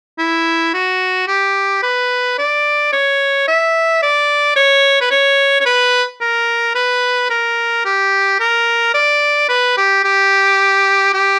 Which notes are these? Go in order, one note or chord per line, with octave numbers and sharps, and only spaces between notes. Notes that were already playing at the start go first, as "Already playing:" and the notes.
E4
F#4
G4
B4
D5
C#5
E5
D5
C#5
B4
C#5
C#5
B4
A#4
B4
A#4
G4
A#4
D5
B4
G4
G4
G4